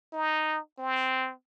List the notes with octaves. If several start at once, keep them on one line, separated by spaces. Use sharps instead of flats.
D#4
C4